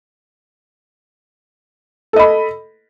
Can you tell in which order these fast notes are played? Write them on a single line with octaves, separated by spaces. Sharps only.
A4 D#5 B5